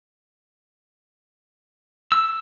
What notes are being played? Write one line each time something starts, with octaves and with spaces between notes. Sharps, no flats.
E6